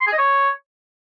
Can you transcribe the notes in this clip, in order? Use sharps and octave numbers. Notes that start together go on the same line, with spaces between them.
C6
G#4
D#5
C#5